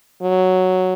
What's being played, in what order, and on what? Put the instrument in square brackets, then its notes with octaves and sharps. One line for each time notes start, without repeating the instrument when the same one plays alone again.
[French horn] F#3